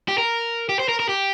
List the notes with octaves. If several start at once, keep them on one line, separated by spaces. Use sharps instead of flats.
G4
A#4
G4
C5
A#4
A#4
G4